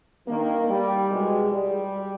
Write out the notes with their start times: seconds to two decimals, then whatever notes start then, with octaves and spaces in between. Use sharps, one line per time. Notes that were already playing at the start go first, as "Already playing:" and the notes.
0.27 G2 D#3 A#3
0.70 G3
1.12 E2 B2 G#3
1.53 G3